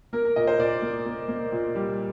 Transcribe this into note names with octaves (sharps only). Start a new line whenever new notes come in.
A#3 A#4
A#4
A#2 D#5
C5
A#2 D5
A#3
A#3
A#3
A#2
G3